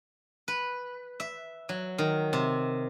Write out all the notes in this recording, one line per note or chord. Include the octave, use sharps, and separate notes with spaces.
B4
E5
F#3
D#3
C3